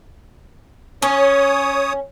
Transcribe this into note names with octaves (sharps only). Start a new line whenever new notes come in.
C#4 C#5 D#6